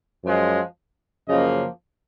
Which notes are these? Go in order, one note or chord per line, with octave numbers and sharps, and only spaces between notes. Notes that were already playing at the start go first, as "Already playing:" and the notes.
F#2 F3 G#3
F#2 C#3 F3 A#3 D#5